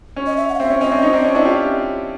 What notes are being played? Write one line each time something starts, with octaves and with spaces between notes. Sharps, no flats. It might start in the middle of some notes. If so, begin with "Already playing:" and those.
C#4
D#5
E5
F#5
F5
C4 E5
C#4
C#4 D#5
C4 D4
C#4 D#4
C4 D4
C#4
D4 E4
F4 G4